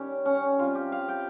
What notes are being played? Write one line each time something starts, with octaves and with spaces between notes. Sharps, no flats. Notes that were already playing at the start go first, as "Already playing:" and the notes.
Already playing: D#3 G3 C#4 G4
C#4
C3 G3 C4 F4
G4
F5
G5